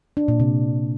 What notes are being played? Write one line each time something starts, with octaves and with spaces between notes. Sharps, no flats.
D4
A#2
C3